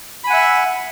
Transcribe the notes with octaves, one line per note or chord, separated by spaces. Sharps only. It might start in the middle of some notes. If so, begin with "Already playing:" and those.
E5 F#5 G#5 B5